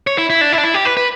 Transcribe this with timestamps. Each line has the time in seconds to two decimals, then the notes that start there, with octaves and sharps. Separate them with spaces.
0.07 C#5
0.18 E4
0.30 E4
0.41 D4
0.52 E4
0.58 D4
0.64 E4
0.74 G4
0.85 B4
0.97 B4